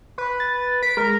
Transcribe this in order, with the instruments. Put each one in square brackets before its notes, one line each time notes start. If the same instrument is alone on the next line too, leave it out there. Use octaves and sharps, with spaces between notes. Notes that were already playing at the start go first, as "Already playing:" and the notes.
[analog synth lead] B4
[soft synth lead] A6
[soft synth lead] B6 [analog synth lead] D7
[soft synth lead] G#3 [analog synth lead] A#4